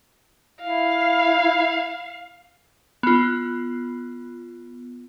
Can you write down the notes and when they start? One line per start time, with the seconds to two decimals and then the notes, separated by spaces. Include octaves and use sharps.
0.62 E4 F5
3.03 B3 F4